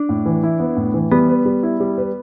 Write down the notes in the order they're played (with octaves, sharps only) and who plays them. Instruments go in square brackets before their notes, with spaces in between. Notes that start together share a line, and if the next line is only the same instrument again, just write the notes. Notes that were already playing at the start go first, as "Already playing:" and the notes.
Already playing: [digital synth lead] D4
[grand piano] A2
E3
E4
B3
A2
E3
[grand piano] G3 [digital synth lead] B3
[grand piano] B4
G3
E4
G3
B4